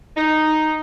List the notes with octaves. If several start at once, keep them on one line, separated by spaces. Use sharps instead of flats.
D#4